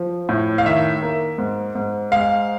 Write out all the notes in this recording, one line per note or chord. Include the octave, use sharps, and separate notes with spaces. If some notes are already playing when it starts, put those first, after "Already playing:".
Already playing: F3
A2
F5
D#3 E5
A#3
G#2
G#2
G#3 F5